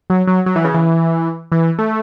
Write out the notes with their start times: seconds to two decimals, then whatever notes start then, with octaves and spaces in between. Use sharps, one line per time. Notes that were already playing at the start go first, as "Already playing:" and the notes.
0.10 F#3
0.27 F#3
0.46 F#3
0.56 E3
0.65 C#3
0.74 E3
1.52 E3
1.79 A3